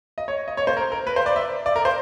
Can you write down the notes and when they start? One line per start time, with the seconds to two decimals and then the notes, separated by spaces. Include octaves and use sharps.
0.18 D#5
0.28 C#5
0.48 D#5
0.57 C#5
0.67 C5
0.77 A#4
0.92 A#4
1.07 B4
1.16 C5
1.26 D5
1.36 E5
1.66 D5
1.76 A#4
1.85 C5